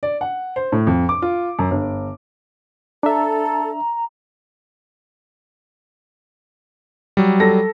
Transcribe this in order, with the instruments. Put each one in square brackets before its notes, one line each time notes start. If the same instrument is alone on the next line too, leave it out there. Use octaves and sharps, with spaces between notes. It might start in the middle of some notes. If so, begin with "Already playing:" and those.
[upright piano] D5
F#5
C5
A2
F2
D6
F4
F#2
G1
[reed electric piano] D4 E5 [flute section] A4 [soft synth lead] A#5
[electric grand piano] F#3 G3
[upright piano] A4 A#6